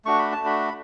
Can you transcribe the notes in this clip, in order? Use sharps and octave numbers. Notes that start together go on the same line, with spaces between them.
A3 D4 F#4 C#6
B5
A5
A3 D4 F#4 B5